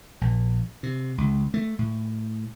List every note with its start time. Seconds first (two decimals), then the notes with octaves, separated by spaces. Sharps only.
0.21 A#1
0.83 C3
1.18 C#2
1.54 A3
1.79 A2